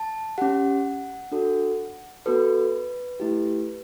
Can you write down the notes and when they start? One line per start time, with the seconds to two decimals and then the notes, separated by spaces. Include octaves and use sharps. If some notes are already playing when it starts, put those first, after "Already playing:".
Already playing: A5
0.38 C#4 G4 F#5
1.32 D4 F#4 A4
2.26 B3 F#4 A4 B4
3.20 A3 E4 G4